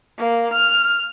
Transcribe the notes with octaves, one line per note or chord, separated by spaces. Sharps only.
A#3
F6